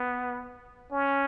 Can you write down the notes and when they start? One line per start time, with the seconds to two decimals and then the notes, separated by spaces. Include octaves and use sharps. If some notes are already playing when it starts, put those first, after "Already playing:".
Already playing: B3
0.92 C#4